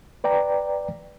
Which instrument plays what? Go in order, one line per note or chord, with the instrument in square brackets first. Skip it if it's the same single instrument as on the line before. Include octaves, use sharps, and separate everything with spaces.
[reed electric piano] B4 D5 G5 A#5